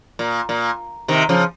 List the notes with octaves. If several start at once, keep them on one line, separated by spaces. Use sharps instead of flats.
A#2
A#2
C3 D#3
C#3 F3